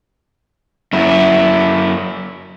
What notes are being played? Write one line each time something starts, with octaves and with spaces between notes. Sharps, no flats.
F#2 E4